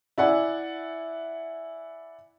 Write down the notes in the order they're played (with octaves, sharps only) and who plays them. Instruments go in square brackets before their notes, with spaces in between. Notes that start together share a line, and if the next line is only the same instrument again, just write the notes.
[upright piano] E4 D5 F#5 G#5